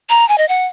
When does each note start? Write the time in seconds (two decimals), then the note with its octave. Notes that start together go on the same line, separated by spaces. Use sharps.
0.10 A#5
0.29 G#5
0.38 D#5
0.49 F#5